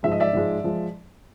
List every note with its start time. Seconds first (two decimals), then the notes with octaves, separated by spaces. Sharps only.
0.03 G#2 F3 G#3 E5
0.12 D#5
0.20 D5 E5
0.33 G#2 F3 G#3
0.64 F3 G#3